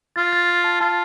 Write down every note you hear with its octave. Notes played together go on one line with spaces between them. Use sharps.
F4 A6
A6
A6
A5
F4 A5